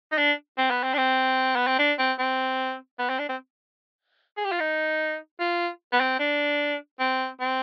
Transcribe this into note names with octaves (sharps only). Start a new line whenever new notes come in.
D#4
D4
C4
B3
C4
D4
C4
B3
C4
D4
C4
C4
B3
C4
D4
C4
G#4
G4
F4
D#4
F4
B3
C4
D4
C4
C4